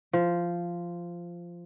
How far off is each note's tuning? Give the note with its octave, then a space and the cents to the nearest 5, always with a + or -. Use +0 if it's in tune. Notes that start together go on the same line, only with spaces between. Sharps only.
F3 -10